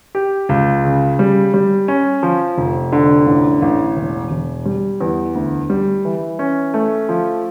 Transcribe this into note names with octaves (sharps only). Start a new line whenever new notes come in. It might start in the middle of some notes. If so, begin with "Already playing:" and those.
G4
C#2
C#3
G3
G3
C#4
F3
F1
D3
A1
A1
E1
E1
G3
E2
D2
G3
E3
C#4
A3
F3